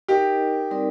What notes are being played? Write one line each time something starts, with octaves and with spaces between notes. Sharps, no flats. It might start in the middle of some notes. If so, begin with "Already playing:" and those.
D#4 G4 A#4 D#5
G3 C4 D#4 A#4 D5